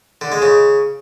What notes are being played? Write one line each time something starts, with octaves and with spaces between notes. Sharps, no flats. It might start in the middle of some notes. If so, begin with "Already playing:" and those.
D3
G#3
C#3